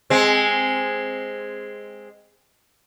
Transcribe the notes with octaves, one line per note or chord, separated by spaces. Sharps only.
G#3 C4